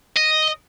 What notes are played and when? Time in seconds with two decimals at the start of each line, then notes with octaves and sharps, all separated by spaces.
0.17 D#5